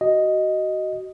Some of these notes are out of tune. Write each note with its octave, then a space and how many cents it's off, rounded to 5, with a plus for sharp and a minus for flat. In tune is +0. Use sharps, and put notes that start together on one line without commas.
F#4 +25 D#5 +0